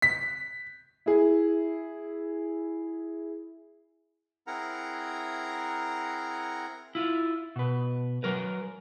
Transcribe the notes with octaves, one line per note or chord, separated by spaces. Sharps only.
B6
E4 G#4
C4 E4 G#4 A#4 F#5 A#5
E4 F4
B2 B4
F#3 A#4 B4